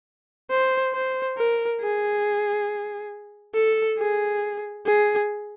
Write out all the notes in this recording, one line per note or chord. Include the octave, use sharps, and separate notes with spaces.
C5
C5
A#4
G#4
A4
G#4
G#4